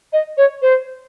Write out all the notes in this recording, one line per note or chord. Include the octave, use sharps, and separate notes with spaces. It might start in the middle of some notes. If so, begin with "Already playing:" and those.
D#5
C#5
C5